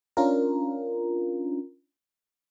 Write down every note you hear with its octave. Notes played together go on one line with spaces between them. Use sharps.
C#4 D4 F4 A#4